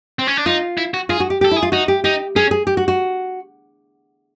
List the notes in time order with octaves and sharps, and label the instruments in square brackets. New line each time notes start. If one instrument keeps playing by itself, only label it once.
[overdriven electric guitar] C4
C#4
D4
[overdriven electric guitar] D#4 [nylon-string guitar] F4
[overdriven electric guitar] E4
F#4
[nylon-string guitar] F4 [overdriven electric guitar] G#4
[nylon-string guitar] F#4
G4
G4
[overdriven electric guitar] A4
[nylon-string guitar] E4
[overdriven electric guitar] G#4
[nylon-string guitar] F4
[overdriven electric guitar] D#4 [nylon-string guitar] F#4
[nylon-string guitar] G4
[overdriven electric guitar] D#4 [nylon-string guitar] G4
[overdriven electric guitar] C#4 [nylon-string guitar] G#4
[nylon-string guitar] G#4
G4
F#4
F#4